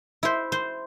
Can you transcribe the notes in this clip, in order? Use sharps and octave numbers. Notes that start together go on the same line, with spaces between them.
E4 C5
C5